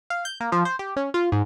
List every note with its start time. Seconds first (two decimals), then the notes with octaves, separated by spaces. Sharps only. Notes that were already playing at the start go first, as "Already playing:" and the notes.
0.10 F5
0.25 G6
0.40 A#3
0.52 F3
0.65 C5
0.79 G4
0.96 C#4
1.14 F4
1.32 G#2